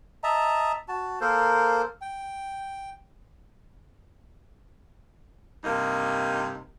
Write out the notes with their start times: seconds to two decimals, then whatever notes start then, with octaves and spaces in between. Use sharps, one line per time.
0.24 D#5 E5 A5 A#5
0.88 F#4 A5
1.21 A#3 A4 A#4 C5
2.01 G5
5.64 G2 C3 A#3 D#4